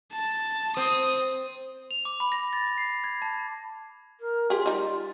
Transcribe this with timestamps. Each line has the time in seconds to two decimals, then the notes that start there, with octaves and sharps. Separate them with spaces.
0.12 A5
0.77 C4 D#6
1.91 F7
2.05 D6
2.20 B5
2.32 A#6
2.53 A6
2.78 C7
3.04 G#6
3.22 A5
4.20 A#4
4.50 F4 G4 G#4
4.66 G3 D#4